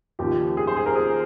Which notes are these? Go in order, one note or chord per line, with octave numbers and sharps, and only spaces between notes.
D#2 C#3 F3 G4
G#4
C5
G#4
A#4
G#4